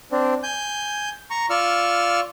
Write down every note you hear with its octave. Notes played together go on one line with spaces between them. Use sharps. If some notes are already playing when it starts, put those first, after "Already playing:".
C4 D4
G#5 G6
A#5 C#6
F4 D5 C#6 E6 F6